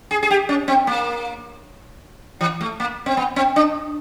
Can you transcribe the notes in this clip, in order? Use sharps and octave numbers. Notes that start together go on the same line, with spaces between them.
G#4
G#4
G4
C#4
C4
A#3
E3
A3
A#3
C4
B3
C4
D4